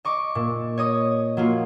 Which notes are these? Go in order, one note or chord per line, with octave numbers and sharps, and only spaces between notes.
D#5 C#6 D6
A#2
C#5 D#5 D#6
F#3 A#3 F4